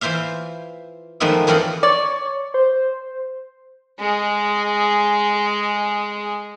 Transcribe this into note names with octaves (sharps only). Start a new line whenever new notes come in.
E3 F4 C5 E5 F5
D#3 F3 G#3 A3 B3 E5
F#2 E3 C4 F4 D#5 F#5
C#5 D5 C#6
C5
G#3 G#4